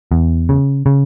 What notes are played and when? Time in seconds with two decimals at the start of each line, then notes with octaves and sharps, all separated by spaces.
0.12 E2
0.49 C#3
0.86 C#3